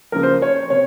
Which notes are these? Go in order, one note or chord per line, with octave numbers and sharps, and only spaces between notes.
C#3 F3 A#3 A#4
C5
C#5
C3 C#5